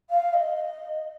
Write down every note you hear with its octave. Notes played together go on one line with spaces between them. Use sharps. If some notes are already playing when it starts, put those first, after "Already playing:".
F5
D#5